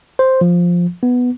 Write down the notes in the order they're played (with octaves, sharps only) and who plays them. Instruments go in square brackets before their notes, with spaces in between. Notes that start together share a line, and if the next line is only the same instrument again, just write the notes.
[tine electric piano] C5
F3
B3